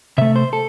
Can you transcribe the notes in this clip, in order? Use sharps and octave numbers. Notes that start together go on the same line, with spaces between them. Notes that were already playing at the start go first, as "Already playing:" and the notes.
C3 A3 E5
C5
A4